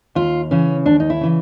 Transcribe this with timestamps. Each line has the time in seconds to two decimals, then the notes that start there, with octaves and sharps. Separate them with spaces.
0.15 D#2 F4
0.51 C#3 E3 C#4
0.86 D#2 D4
1.00 D#4
1.10 E4
1.21 C#3 E3